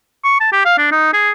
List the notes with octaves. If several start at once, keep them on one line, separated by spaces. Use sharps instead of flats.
C#6
A5
G4
F5
D4
D#4
G#4